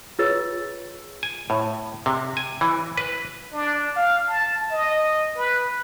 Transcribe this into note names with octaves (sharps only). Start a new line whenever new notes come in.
F4 G#4 B4 C#5 E6 A6
G#5
A2
C3
G#5
E3
B4
D4
F5
A5
D#5
B4